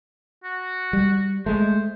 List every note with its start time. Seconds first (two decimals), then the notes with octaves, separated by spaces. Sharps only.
0.44 F#4
0.93 G3
1.46 G#3 A3 C5